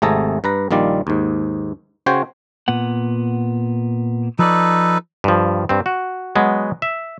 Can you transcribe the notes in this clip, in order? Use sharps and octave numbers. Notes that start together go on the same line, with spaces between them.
G#1 C3 A3 G#4 A4 A#5
G2 B4 A#5
A#1 D#3 G3 F4 D5
D#2 G#2
C#3 F#4 C5 C#5 G5
A#2 B3 F#5
F3 D#4 A4 B4 D5
G2 F3
G2 C4
F#4
F#3 G#3 B3
E5